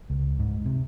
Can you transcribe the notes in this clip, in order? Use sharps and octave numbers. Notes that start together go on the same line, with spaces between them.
C#2
G#2
C3